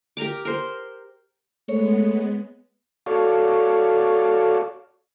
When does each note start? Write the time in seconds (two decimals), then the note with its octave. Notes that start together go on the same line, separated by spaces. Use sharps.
0.17 G4 A#4 A#5 D6
0.45 A#4 C5
1.68 G#3 A3 B3 C#5
3.06 F#4 A4 C#5 D5 F5